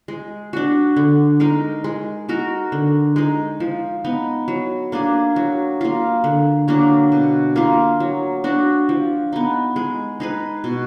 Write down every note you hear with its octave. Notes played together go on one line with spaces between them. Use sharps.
G#3
D4 F#4
D3
G#3 D#4 A#4
G#3
D#4 F#4 A#4
D3
G#3 D#4
F3
B3 D#4
F#3
A#3 D4 G#4
F#3
A#3 F4
D3
F#3 A#3 D4
B2
A#3 F4
F#3
D4 F#4
F3
B3 D#4
G#3
D#4 G#4 B4
B2